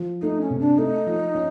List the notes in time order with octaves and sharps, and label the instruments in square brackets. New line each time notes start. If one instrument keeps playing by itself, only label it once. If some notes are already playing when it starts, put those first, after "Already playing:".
Already playing: [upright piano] F3
[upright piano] A3 [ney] D#4
[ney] C#4
[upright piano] C3
[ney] D4
[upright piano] A3 [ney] D#4
[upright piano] F3
C#4